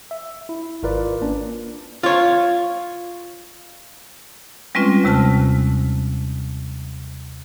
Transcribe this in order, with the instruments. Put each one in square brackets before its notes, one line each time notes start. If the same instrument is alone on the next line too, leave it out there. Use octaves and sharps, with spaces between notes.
[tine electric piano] E5
E4
G#1 F4 A#4 B4 D5
A#3 C#4 D4
[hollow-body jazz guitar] F4 C#5
[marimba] G3 G#3 C4 C#4 F4 B4
D#2 C3 G#3 A5 F6